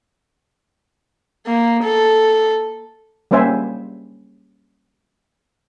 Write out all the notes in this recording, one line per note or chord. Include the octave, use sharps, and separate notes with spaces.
A#3
A4
G3 A#3 C#4 C5 E5 G#5